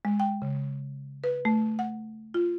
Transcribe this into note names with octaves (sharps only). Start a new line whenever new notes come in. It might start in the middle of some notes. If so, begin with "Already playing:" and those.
G#3
G5
C#3
B4
A3
F#5
F4